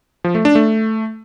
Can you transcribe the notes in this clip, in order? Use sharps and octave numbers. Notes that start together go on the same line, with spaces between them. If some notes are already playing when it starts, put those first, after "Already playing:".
F3
A3
D4
A3